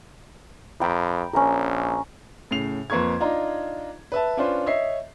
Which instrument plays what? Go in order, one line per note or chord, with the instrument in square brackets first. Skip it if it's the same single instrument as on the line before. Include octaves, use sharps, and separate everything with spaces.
[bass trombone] F2 [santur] G5 A#5 B5
[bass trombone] A#1 [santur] C#4 A#4
[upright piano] A2 C#3 C7 F7
F2 A#3 B4 C#6 G#6
D4 D#4 F4 A#5
B4 E5 A5
C#4 D4 F4 B4 C5
C#5 D#5 E5 C7